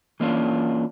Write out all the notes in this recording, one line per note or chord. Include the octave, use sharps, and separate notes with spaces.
E3 A#3 C#4 D4 F4